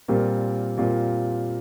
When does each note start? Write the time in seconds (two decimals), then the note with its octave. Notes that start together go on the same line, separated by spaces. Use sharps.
0.08 A#2 G3 C4 F4 A#4
0.78 A#2 G3 C4 F4 A#4